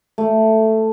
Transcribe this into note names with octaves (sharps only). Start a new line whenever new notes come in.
A3